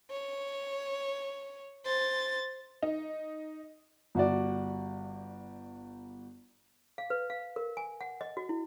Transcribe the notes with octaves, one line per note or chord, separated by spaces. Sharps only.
C#5
C5 A6
D#4
G1 F#4 D5
F5
B4
F5
A#4
G#5
F#5
D#5
F#4
E4